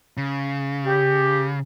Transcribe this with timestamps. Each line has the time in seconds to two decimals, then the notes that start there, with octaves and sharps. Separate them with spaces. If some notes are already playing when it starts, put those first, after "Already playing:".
0.17 C#3
0.86 G4